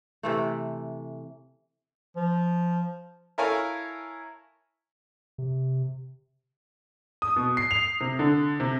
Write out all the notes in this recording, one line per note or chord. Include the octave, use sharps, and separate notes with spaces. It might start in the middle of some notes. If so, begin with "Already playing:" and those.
C3 E3 A3
F3
E4 A4 A#4 C#5 F5 G#5
C3
D#6
B2
C7
F7
C3
D3
C3